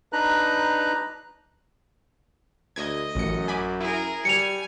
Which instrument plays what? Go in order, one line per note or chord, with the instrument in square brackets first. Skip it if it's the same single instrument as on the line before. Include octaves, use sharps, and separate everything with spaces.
[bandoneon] D4 D#4 B4 A#5 F#6
[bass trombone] D2 [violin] D#5 [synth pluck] G#6
[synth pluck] A1 C#7 [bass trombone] F#2
[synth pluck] G#5 B5 D6
[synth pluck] E4 [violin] G#4 A#4
[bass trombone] G3 [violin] G#5 [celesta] C#7 F7